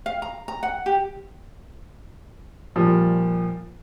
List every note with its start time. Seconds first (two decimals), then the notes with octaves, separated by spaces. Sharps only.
0.06 F5
0.22 A#5
0.48 A#5
0.63 F#5
0.86 G4
2.76 A#2 F3 G3